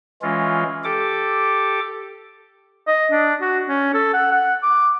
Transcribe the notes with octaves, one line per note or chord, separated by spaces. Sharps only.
E3 G#3 C#4 F4
G4 A4 D6
D#5
D4
F#4
C#4
A4
F#5
F#5
D6